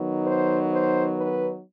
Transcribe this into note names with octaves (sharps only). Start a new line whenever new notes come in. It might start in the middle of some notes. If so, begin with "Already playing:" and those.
Already playing: D#3 F#3 B3 D#4
C5
C5
B4